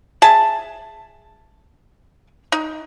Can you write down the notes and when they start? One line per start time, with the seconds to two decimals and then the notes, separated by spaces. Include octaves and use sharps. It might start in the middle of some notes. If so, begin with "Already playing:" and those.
0.22 G#4 E5 A5
2.52 D#4